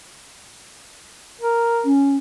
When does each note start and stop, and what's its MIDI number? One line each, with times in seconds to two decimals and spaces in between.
1.41 1.90 70
1.85 2.17 61